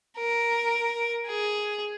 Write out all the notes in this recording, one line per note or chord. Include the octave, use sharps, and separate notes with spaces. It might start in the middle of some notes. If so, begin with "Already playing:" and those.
A#4
G#4